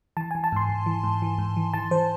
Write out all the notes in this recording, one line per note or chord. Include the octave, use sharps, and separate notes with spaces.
E3 A5
G#5
E3
A5
G#2 C6
G#2
E3
G#2
E3
G#2
E3
E3 A5
E3 C5